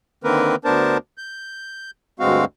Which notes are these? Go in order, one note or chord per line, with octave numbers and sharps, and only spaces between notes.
D3 D#3 A#3 C4 A#4 B4
D2 B3 D4 A#4 C5 A5
G6
D2 G2 G#3 C4 F#4 F5